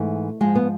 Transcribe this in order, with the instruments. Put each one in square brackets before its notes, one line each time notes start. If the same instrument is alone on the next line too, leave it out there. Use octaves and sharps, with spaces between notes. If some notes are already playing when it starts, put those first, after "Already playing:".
Already playing: [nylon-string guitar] G#2 E3 A3
G#2 F3 G#3
B3